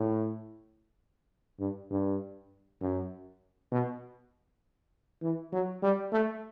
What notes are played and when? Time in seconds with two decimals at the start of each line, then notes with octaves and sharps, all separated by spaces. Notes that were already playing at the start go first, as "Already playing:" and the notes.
Already playing: A2
1.60 G2
1.91 G2
2.81 F#2
3.72 B2
5.22 E3
5.52 F#3
5.83 G3
6.12 A3